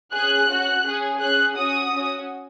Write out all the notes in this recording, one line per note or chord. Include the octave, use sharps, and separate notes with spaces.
C#4 G#4 F#6
C#4 F#4
C#4 G#4
C#4 G#4 F#6
C#4 F#4 D#6
C#4 F#4